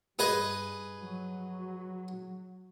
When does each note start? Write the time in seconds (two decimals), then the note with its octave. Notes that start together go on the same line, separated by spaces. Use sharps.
0.19 G2 G#4 B4 D#5
1.00 F#3